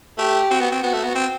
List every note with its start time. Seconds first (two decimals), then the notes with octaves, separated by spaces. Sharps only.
0.18 A3 G4
0.51 C4 F#4
0.61 B3
0.72 C4
0.82 B3 F#4
0.93 A3
1.04 B3
1.15 C4